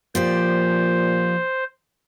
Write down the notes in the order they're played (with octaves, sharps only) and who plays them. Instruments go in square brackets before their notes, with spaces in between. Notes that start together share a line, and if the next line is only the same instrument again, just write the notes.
[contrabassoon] A#2 [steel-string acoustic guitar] F3 G4 D5 [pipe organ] C5